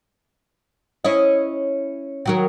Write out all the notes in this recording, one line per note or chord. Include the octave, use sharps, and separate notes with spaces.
C#4 E4 D#5
D#3 F#3 A#4